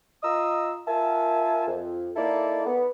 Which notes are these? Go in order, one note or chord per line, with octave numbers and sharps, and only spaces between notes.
F4 D#5 A#5 D#6 E6
F4 A#4 E5 G#5 A5
F2
A#3 D#4 E4 A4 D5
B3